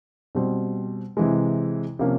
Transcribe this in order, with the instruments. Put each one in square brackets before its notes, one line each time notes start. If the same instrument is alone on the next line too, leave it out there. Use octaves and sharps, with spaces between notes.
[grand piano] B2 G3 C4
C3 E3 G#3
C3 F3 A#3 C#4 F4